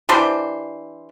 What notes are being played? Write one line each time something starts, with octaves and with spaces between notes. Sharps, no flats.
E3 D4 G4 C5